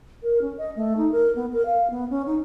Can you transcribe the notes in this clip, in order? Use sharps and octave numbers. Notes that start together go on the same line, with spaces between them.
A#4
C#4
D#5
A3
D#4
A#4
B3
A#4
F5
B3
C#4
D#4